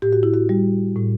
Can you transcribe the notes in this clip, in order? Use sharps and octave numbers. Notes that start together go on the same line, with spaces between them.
A2 G4
F#4
E4
F#4
G3
A2